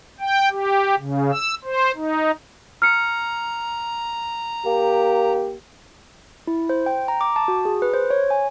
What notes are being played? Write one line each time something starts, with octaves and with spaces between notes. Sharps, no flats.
G5
G4
C#3
E6
C5
D#4
A#5 F6 C#7
A#3 G4
E4
C5
G5
A#5
D6
A5
F#4
G#4
B4
C5
C#5
G#5